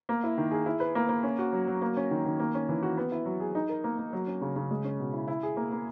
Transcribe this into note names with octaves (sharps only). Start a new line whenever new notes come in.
A#3
E4
D#3
G#4
E4
B4
A#3
A#3
C#4
F#4
F#3
F#3
A#3
C#4
D#3
D#3
A#3
C#4
E3
F#4
B3
E4
F#3
G#4
D#4
A#4
A#3
A#3
F#3
C#4
C#3
C#3
G#3
C#4
B2
E4
E4
G#4
A#3
A#3